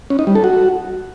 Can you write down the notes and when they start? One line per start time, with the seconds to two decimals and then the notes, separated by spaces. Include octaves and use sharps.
0.10 C#4
0.19 D#4
0.27 G3
0.35 A4
0.44 F#4